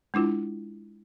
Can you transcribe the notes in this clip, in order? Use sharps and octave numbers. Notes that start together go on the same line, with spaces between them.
G#3 D4 E4 F4